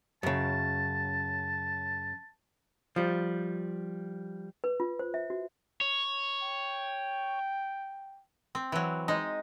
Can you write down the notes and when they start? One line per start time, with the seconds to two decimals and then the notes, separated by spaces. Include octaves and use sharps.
0.23 F#2 C#3 A5
2.96 F3 G3
4.64 B4
4.80 F4
4.99 C5
5.14 E5
5.30 F#4
5.81 C#5
6.42 G5
8.55 C4
8.72 E3 F#3
9.08 G#3 D#4